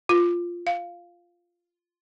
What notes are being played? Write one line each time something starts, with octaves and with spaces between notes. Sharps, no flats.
F4
F5